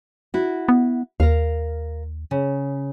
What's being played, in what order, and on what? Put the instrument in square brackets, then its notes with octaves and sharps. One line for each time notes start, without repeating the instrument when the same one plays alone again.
[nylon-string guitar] E4 F#4
[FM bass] B3
[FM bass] D#2 [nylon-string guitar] A#4 F5
[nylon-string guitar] C#3